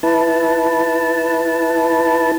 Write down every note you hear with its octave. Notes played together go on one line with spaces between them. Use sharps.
E4 B4 A5